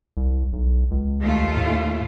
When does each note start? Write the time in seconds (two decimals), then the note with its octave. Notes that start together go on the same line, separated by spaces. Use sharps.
0.17 C2
0.53 B1
0.91 C#2
1.22 D#2 A3 F4
1.57 A2